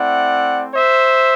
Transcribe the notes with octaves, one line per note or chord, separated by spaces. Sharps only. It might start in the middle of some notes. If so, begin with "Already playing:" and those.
Already playing: A3 C4 E4 D5 F#5
C5 E5